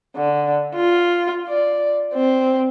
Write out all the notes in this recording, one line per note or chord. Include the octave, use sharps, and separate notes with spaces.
D3
F4
D5
C4